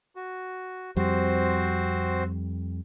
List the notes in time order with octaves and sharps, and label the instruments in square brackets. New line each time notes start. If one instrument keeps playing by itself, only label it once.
[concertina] F#4
[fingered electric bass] F2 G3 [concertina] C4 F#4 C5